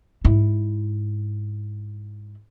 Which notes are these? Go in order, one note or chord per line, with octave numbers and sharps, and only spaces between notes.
G#2 E4